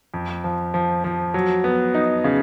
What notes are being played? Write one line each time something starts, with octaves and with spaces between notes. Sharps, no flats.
F2
F3
F3
F3
F#3
B3
D#4
C#3